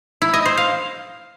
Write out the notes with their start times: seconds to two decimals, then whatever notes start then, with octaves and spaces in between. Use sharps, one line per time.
0.22 E4
0.34 D#5
0.46 C5
0.57 F5